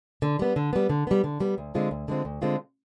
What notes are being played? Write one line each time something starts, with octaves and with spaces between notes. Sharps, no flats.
D3
G3 B3
D3
G3 B3
D3
G3 B3
D3
G3 B3
D2
D3 G#3 C4 F4
D2
D3 G#3 C4 F4
D2
D3 G#3 C4 F4